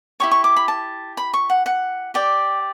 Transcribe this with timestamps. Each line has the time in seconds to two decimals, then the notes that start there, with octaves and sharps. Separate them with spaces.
0.20 E4 G4 C#5 C#6
0.31 C#6
0.44 D6
0.56 B5
0.68 A5
1.17 B5
1.34 C#6
1.50 F#5
1.66 F#5
2.14 G4 D5 G5